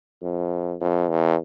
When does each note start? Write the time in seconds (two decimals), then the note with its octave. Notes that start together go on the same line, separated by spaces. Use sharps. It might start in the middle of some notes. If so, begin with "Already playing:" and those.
0.22 F2
0.81 F2
1.10 E2